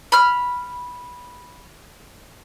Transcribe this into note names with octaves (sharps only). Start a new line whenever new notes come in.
B5 F6